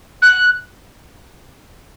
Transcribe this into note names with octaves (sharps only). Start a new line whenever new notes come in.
F#6